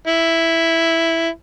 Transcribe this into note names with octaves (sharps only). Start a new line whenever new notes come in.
E4